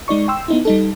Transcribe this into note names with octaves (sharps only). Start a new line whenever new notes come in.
G#3 D#4 D5 C#6
G5 C6 E6
B3 D#4 E4
G3 D#4 A4